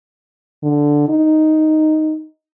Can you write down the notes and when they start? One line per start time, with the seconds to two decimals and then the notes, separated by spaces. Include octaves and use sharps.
0.63 D3
1.09 D#4